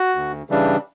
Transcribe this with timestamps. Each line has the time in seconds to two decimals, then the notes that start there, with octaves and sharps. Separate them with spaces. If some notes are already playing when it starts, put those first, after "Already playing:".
Already playing: F#4
0.15 D2
0.50 C#3 E3 G3 D4